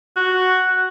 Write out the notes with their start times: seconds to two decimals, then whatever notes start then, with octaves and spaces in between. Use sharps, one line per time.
0.17 F#4